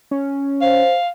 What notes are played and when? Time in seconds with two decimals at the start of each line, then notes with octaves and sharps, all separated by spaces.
0.11 C#4
0.62 C5 F5